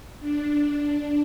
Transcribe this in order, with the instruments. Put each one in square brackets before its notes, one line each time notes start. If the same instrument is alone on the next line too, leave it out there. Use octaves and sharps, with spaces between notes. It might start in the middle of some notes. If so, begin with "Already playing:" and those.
[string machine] D4